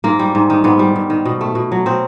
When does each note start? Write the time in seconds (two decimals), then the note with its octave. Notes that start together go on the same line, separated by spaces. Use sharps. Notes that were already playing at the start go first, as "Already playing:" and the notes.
0.04 G#2 A#3
0.19 G3
0.35 G#2
0.50 D#3
0.64 G#2 B3
0.79 G3
0.96 G#2
1.10 D#3
1.25 B2
1.41 A3
1.55 B2
1.72 F#3
1.86 B2 C4